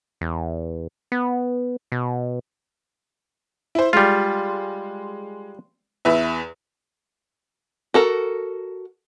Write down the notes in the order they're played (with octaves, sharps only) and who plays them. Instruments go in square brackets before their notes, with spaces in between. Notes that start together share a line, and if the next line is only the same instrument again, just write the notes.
[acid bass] E2
B3
B2
[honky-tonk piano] E4 C5
[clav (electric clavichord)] G3 F4 [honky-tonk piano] G#3
[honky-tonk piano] E2 B4 E5
[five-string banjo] F#4 A4 A#4